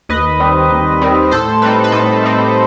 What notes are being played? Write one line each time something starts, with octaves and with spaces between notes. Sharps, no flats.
D#2 B4 D#5
D#3 G3 C4
D#2
D#3 G3 C4
A2 A4 C5
G3 C4 D#4 B4
B4
A2 A4
G3 C4 D#4